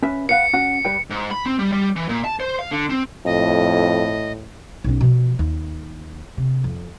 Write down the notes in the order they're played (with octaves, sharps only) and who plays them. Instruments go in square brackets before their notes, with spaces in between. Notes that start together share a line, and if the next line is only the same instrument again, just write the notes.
[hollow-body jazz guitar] C#4 B4 E5
[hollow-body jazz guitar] B4 F5 F#5 [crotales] C#7
[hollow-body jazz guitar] C#4 F#4 F#5
G3 B4 G5
[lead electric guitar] G#2
B5
C4
G3
G3
E3
A#2
A5
C5
F5
D3
C4
[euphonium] F2 [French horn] A2 [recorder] D#5
[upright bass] B1 C#4
B2 F3
D#2
C3
F2